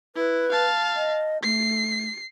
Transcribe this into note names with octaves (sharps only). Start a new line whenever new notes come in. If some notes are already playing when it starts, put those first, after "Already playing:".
E4 B4
F5 A5
D#5
A3 C7